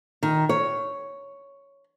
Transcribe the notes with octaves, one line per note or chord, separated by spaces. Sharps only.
D#3
C#5